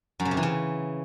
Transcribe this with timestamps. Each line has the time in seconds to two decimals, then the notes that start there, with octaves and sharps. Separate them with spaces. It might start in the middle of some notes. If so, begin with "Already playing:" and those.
0.20 F#2
0.25 C#3
0.31 C3
0.37 E3
0.43 C#3